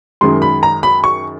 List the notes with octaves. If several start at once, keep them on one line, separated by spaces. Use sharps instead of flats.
F#2 D#3 G#3 C6
B5
A#5
B5
C#6